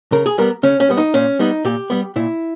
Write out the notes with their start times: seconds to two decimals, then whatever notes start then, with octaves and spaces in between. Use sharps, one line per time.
0.12 C#3 A#4
0.26 G#4
0.38 G3 B3 A#4
0.63 C#3 C#4
0.80 C#4
0.89 G3 B3
0.97 D#4
1.14 A#2 C#4
1.39 G3 B3 D#4
1.65 A#2 G4
1.90 G3 B3
2.16 A#2 E4